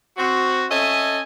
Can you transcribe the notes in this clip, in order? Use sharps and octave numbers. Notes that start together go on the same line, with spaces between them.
C4 F#4
C#4 A4 D#5 E5 G#5